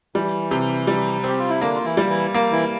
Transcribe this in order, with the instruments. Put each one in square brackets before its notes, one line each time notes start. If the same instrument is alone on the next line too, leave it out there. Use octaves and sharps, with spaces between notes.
[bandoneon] E3 [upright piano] G3
[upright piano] C3
G3
[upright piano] C4 [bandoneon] G4
[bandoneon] F4
E4
[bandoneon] D3 D4 [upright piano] A#3
[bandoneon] F4
E3 E4
[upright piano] G3
[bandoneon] E3 E4
[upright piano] A#3
[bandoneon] E3 E4